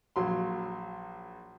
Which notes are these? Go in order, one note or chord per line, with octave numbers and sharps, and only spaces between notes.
A#1 F#3 C6